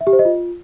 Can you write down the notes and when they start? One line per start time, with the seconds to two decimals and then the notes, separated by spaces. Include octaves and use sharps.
0.01 E5
0.07 G4
0.13 C5
0.19 D#5
0.25 F4